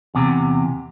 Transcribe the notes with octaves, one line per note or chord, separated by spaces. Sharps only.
E2 C3